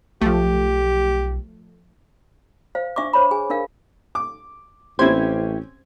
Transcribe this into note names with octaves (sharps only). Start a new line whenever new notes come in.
B1 F3 A3 G4
C5 F5
D4 E5 C#6 D6
C5 C#5 B5
G#4 G#5
D4 A#4 F5
D6
A1 C4 C#4 E4 G4 C5 G5 G#6